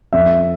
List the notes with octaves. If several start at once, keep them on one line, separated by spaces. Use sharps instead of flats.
F2 E5